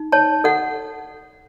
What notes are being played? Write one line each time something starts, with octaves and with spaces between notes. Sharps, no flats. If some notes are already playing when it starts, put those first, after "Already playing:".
Already playing: D#4
C#5 A5
A4 F#5